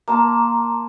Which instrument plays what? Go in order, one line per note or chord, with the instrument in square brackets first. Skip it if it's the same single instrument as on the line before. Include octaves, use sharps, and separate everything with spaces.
[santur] A#3 A5 [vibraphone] A#5 C6